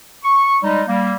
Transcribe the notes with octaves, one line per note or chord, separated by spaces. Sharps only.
C#6
G3 G#3 D#4
G3 A#3